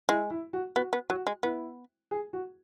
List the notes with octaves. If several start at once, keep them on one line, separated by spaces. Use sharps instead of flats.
G#3 E4
E4
F#4
B3 F#4
B3
F#3 F#4
G#3
B3 E4
G#4
F#4